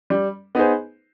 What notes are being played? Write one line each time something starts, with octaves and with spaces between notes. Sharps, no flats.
G3
B3 D#4 G#4 C5